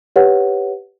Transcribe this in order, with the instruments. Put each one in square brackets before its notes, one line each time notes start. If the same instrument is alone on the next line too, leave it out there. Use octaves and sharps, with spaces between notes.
[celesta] G4 B4 C#5 F#5